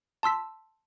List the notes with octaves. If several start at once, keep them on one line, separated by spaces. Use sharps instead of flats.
A5 C6 E6 B6